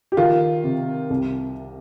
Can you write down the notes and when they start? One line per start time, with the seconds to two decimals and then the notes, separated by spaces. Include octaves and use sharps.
0.12 G4
0.17 D#3 F4
0.64 C3
1.10 C2